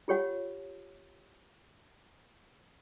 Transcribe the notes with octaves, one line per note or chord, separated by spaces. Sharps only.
F4 G4 C#5 F#5